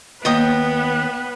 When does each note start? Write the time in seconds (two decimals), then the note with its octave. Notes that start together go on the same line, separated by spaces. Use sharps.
0.25 D#2 B3 B4 D#5 G5 D#6